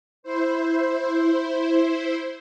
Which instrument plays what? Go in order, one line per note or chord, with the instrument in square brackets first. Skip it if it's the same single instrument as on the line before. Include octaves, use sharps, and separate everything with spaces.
[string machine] E4 C5